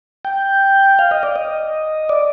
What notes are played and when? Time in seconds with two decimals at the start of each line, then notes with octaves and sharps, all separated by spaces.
0.25 G5
0.99 F5
1.11 D#5
1.23 D5
1.36 D#5
2.09 D5